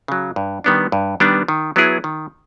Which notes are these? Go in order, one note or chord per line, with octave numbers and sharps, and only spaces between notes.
C#3 F#3
G2
D#3 G3 B3 D4
G2
D#3 G3 B3 D4
D#3
F#3 B3 E4 G#4
D#3